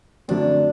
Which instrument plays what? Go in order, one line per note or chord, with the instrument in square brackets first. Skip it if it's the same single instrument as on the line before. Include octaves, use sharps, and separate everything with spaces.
[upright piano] F#2 D3 F#3 A3 C4 [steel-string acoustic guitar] D4